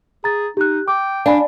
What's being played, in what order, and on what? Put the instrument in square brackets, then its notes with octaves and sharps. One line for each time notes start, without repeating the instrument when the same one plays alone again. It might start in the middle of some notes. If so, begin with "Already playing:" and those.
[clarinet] G#4 [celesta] A#5 A6
[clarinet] D#4 [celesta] G4 F#6
[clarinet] G5 [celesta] D6
[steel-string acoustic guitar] D4 [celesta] F5 G#5 B5